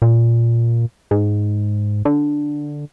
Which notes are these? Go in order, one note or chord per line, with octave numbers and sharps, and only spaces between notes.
A#2
G#2
D3